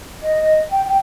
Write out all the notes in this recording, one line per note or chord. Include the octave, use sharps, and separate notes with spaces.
D#5
G5
G5